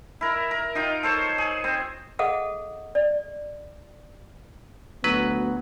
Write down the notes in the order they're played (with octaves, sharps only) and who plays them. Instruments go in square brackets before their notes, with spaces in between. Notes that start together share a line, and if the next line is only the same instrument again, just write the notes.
[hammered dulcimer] E4 A#4
A#4
D#4 F4 G5
A4 C5 C#5
G#4
C4 C5
[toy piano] G#4 A4 D#5 F5 F#5
D5
[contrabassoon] D2 [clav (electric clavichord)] F#3 B4 [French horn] B3